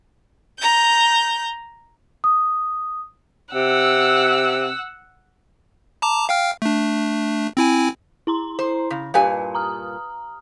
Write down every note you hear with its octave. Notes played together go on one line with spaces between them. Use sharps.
A#5 G6
D#6
C3 F#5 E6
A5 A#5 D6
F5 G5 F6
A3 D4
C4 E4 G#5
E4 A#5 C6
C5
C#3
G2 A#2 G4 B4 F5 G#5
A#5 D#6 F6